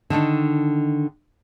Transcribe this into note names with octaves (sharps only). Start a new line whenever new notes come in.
D3 D#3 D4 D#4